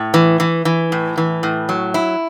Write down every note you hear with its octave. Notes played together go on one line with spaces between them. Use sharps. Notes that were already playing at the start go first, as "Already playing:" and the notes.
Already playing: A2
E3
E3
E3
A2
E3
A2
F#3
E4